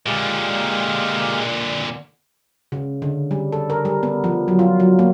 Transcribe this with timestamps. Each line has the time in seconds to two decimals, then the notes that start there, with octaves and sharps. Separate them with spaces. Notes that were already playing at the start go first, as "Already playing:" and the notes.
0.06 A#2 D3 G#3 G4 F5
2.72 C#3
3.02 D3
3.31 G3
3.52 A4
3.70 A#4
3.85 G3
4.03 B3
4.24 F3
4.48 F#3
4.59 F4
4.80 F#3
4.99 A#3